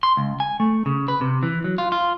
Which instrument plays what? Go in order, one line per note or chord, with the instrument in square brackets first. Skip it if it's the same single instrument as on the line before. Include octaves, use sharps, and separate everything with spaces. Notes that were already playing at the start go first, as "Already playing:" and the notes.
[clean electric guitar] C6
C#2
G#5
A3
C#3
B4
C3
E3
F#3
F4
F4